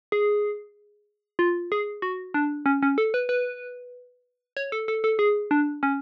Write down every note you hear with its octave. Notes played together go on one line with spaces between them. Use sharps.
G#4
F4
G#4
F#4
D4
C#4
C#4
A4
B4
B4
C#5
A4
A4
A4
G#4
D4
C#4